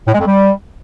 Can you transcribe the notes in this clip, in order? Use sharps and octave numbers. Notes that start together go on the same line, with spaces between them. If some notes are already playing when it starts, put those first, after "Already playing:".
A2
G#3
F2
G3